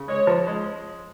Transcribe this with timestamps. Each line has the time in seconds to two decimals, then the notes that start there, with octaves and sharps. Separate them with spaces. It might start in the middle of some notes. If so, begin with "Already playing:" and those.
Already playing: C#3
0.08 G#3 C#5
0.27 F3
0.47 G#3